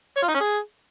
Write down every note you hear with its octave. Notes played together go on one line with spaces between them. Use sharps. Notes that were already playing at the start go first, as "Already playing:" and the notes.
C#5
F4
D#4
C#4
G#4